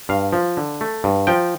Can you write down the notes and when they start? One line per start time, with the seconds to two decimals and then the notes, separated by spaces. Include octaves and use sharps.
0.09 G2 F5
0.33 F3
0.57 D3
0.81 A3
1.04 G2
1.27 F3 G5